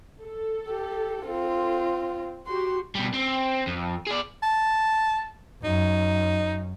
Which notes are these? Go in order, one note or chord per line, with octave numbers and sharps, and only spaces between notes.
A4
G4
C4 F4
F#4 G4 C6
B2 G3
C4
F2
G#4 D5
A5
F#2 D#4